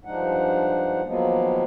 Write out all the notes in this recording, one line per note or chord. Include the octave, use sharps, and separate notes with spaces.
G2 F3 G#3 D4 D#4 F#5
D#3 F3 F#3 G#3 A#3 B3